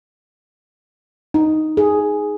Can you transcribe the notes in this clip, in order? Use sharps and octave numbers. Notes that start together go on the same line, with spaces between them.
D#4
G#4